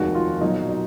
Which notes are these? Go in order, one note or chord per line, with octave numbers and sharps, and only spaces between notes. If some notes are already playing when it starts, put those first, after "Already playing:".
Already playing: F1 D#2 D#3 G#3 F#4
F4
B1 A#2 F#3 D#4
D#4